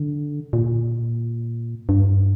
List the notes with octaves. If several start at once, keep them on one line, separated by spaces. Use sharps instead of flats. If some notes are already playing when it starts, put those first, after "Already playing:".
Already playing: D3
A#2
G2